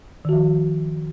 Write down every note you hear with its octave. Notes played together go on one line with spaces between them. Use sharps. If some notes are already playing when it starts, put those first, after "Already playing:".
D#3 F3 F#4